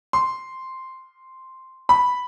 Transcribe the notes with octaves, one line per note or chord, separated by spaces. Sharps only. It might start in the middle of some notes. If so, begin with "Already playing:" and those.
C6
B5